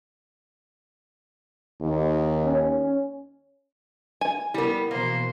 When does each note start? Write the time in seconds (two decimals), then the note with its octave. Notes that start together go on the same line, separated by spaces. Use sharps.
1.81 D#2
2.46 C#4
4.21 G#5
4.54 G3 B3 E4 A#4
4.91 B2 E3 A#3 C5